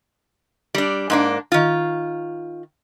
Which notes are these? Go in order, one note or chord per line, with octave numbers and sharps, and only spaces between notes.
G3 D4
G#2 A#3 D4
D#3 F4